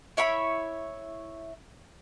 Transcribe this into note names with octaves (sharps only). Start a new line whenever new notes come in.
E4 C#5 E5 B5